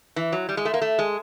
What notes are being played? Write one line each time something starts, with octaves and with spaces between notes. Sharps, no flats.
E3
F#3
G3
G#3
A3
A#3
A3
G#3